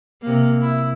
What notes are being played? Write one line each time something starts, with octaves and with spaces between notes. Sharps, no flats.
C3 A#3
E4